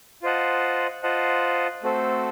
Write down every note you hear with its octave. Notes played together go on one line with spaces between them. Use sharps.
F4 C5 D#5 F#5 A5
F4 C5 D#5 F#5 A5
A3 C4 F#4 A4 C5